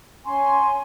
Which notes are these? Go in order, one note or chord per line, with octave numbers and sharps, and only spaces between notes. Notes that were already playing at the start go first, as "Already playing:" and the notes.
C#4 G#5 C6 C#6